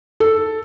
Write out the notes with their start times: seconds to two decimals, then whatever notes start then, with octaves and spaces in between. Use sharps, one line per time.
0.20 A4